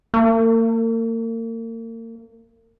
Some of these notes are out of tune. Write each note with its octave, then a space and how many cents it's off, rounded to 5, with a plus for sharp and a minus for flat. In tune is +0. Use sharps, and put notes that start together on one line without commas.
A#3 -40